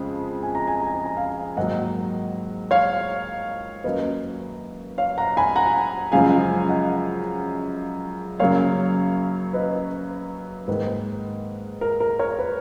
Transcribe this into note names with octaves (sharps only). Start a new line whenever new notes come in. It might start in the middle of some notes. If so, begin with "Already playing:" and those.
Already playing: F2 C#3 G#3
G#5
A#5
G#5
A#5
G#5
A#5
F5 G#5
G#2 D#3 F#3 A#3 D#5 F#5
C#5 F5
F#2 D#3 F#3 A#3 B4 D#5
C#5 F5
F#5 A#5
G#5 B5
F#5 A#5
F#2 C#3 F3 G#3 F5 G#5
D#5 F#5
F#2 C#3 F#3 A#3 C#5 F5
B4 D#5
G#2 D#3 A#3 B4
A#4
A#4
A#4 C#5
B4